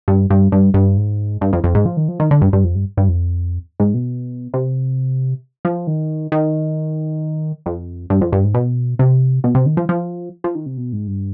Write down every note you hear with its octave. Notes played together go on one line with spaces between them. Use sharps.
G2
G2
G2
G2
G#2
G2
F2
F2
G#2
F3
D#3
F3
D#3
D3
G2
G2
F2
G2
G2
F2
G#2
B2
C3
F3
D#3
D#3
F2
G2
F2
G2
G#2
B2
C3
B2
C3
D#3
F3
F3
F3
D#3
C3
B2
G#2
G2